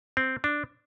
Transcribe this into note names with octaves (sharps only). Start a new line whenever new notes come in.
C4
D4